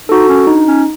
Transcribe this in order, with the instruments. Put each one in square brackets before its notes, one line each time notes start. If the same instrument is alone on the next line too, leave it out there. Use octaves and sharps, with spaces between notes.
[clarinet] D#4 [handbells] F#4 A4
[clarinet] C#4
[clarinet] D4 [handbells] D#4
[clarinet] C#4